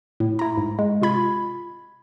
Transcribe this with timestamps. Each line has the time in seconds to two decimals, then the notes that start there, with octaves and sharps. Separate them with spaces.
0.20 A2
0.39 E4 A#5
0.57 G#2
0.79 G#3
1.02 C3 F4 B5 G#6